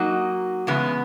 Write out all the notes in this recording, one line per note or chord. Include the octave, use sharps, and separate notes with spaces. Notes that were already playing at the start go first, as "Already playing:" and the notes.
Already playing: F#3 A#3 D#4 F#4
E2 C#3 G#3 B3